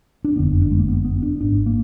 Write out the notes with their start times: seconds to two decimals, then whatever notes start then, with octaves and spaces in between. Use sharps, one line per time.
0.24 D4
0.36 F#1 F2 D3 B3
0.61 D4
0.71 G#3
0.79 A#3
0.88 B3
1.05 B3
1.22 D4
1.41 G#1 G#2 D4
1.66 A#3